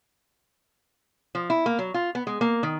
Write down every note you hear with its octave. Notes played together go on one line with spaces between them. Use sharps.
F3
E4
A#3
F#3
F4
B3
G#3
A#3
D#3